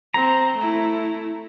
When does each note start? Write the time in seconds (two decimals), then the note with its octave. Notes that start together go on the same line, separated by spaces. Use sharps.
0.14 C4 A#5
0.59 A3 E4